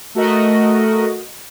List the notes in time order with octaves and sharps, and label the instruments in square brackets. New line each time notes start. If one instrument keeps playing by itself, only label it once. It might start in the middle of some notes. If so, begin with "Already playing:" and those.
[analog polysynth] A3 F#4 A#4 D#5